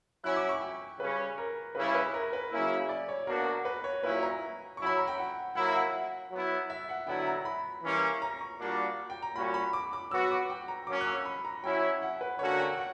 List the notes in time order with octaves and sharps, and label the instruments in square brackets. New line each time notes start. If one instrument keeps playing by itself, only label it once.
[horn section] F#3 C#4 E4 [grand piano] F#6
[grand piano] D6
C#6
G5
[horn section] C#3 G3 C#4 [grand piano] B4
[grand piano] A#4
[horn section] C#3 G3 C#4 E4 [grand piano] B4
[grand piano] B4
A#4
B4
[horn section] C#3 F#3 A#3 C#4 E4
[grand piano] D5
C#5
[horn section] B2 A#3 D4 F#4 [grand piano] A#4
[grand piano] B4
C#5
[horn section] A#2 F#3 C#4 E4 [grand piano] B4
[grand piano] A#5
[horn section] F#3 C#4 E4 [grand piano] C#6
[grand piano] B5
A#5
G5
F#5
[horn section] F#3 A#3 E4 [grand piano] F#5
[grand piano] F#5
[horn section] F#3 B3 E4
[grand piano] E5
F#5
[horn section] D3 F#3 B3 E4 [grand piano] G5
[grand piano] A#5
B5
[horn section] E3 G3 A#3 C#4
[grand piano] A#5
C#6
[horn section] A#2 G3 A#3 D4 F#4
[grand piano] G5
A#5
[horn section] A#2 G3 C#4 F#4 [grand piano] B5
[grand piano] B5
D6
D6
[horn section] F#3 B3 F#4 [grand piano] E6
[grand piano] D6
G5
A#5
[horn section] F#3 A#3 C#4 [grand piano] D6
[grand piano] F#6
E6
B5
A#5
[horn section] F#3 C#4 E4 [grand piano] G5
[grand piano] F#5
B4
[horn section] D3 A#3 C#4 F#4 [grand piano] C#5
[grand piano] G5
F#5